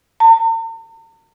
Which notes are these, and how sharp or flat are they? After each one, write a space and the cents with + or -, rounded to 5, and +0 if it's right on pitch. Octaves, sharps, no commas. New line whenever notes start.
A#5 -45